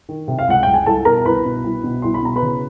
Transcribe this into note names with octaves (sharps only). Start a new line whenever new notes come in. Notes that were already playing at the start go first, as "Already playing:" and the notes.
D#3
C3
F5
C#2 F#5
C#2 G5
G#5
C2 A4 A5
B2 A#4 A#5
C2 B4 B5
B2
C2
B2
C2 C6
B5
B2 A#5
B4 B5
C#3